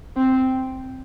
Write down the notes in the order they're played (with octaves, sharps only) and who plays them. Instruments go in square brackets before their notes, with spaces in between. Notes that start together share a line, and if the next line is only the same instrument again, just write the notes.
[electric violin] C4